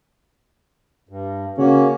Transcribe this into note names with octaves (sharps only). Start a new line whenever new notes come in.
G2
C#3 A#3 C#4 F#4